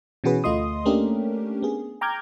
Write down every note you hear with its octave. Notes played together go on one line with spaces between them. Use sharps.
B2 E3 C#4 F#4 G#4 B4
D2 A3 F4 D#5 C6 D#6
A3 A#3 C#4 D4 G4 A#4
B3 G#4
G5 A#5 D6 F6 G6 G#6